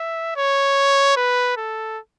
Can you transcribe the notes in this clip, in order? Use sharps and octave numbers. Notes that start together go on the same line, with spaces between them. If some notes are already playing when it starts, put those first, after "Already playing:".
Already playing: E5
C#5
B4
A4